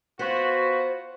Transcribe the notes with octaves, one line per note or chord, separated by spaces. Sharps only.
B3 F4 F#4 C5